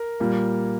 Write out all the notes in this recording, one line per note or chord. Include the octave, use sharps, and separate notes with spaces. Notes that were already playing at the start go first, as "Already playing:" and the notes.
Already playing: A#4
A#2 G3 A#3